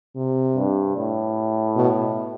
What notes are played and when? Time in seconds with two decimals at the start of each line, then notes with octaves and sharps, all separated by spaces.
0.16 C3
0.55 G2
0.96 A2
1.76 B2